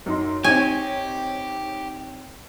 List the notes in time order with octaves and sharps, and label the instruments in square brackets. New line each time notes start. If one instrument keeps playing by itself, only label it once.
[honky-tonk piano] F#2 D#4 C6
[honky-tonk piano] C4 D#4 C#5 [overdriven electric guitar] G4 [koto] G#5